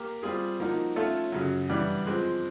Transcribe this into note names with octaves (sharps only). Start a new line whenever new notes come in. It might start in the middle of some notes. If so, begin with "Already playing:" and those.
Already playing: A#3 G4 A#4
G3 C4 F4 G#4
F3 A#3 D#4 F#4 A#4
A3 C#4 F4 A4 C#5
F#2 C#3 F#3
G2 E3 G3 B3 D4
F3 G#3 C4